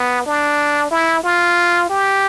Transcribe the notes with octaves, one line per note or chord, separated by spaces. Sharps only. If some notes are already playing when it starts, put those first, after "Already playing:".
Already playing: B3
D4
E4
F4
G4